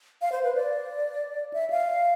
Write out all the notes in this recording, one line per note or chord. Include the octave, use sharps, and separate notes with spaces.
F5
C5
B4
D5
E5
F5